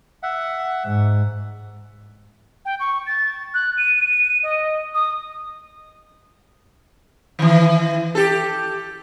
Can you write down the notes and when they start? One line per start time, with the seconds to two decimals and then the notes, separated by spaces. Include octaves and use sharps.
0.23 E5 F#5
0.84 G#2
2.65 G5
2.80 C#6
3.06 A6
3.54 F#6
3.77 D#7
4.43 D#5
4.94 D#6
7.39 D#3 E3
8.15 G4 A4